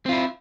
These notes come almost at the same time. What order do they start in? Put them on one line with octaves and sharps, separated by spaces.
C4 F4 E4